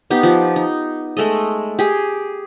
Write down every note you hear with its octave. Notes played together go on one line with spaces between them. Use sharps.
B3 D#4 G4
F3
D#4
G#3 A3 A4 D#5
G4 G#4 G5